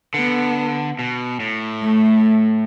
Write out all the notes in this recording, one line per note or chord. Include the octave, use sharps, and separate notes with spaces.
D3 B3
B2
A2
A3